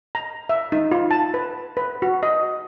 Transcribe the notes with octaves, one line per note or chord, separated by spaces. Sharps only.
A#5
E5
D#4
F4
A5
B4
B4
F#4
D#5